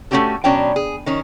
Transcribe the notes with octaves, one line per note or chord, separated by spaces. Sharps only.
A3 C4 C#4 F#4 G4 A4
B2 F#3 C#4 D4 G5
G#4
D#3 C#4